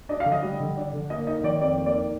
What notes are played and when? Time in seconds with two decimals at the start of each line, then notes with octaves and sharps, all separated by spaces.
0.09 D4 D#5
0.20 F5
0.25 D3
0.32 D#5
0.42 G3
0.60 D3
0.77 D4
0.93 D3
1.10 A#3 D#5
1.27 D#4 D#5
1.43 D#3 D5
1.61 F2 D5
1.78 A#3
1.86 D5
1.94 D#4